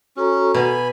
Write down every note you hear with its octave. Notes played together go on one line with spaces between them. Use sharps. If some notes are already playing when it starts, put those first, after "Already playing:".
C#4 F#4 A4 A#5
B2 G#5 B5